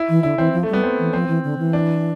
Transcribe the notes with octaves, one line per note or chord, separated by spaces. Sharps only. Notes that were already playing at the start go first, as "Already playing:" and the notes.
Already playing: E4
E3
D3 E4
E3 C4
F3
A3
G3 B3
C4
E3
F3 C4
E3
D3
E3
D4